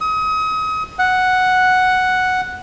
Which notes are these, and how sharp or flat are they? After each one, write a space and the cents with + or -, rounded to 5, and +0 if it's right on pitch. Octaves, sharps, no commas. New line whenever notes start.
D#6 +35
F#5 +0